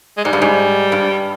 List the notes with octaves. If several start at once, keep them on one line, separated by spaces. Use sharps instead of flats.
G#3
G#2 G3
G2
G#2
G2